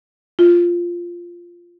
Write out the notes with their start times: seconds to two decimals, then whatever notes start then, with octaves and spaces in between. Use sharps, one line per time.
0.39 F4